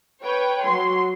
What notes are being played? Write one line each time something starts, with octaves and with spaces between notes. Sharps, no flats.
B4 C#5 G5
F#3 C6